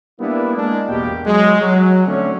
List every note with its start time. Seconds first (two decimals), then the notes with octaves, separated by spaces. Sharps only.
0.20 G3 A#3 B3 D4 E4
0.57 G#3 A#3 D4
0.89 A1 E2 B2 A#3 G4 G5
1.26 F#3 G#3
1.60 F#3
2.07 D3 A3 C4 C#4